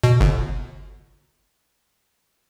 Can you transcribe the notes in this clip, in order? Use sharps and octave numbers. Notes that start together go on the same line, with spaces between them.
B2
G1